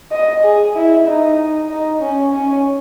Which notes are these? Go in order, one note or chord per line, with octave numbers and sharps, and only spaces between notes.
D#5
G#4
E4
D#4
D#4
C#4
C#4